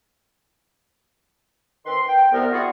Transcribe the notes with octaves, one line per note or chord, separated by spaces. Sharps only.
D#3 C4 B4 C6
G5
C2 B3 A#4
C4 E4 F#4 G#4 D5 F#5